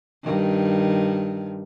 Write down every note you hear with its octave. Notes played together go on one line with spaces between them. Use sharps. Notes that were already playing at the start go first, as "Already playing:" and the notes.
G2 D#3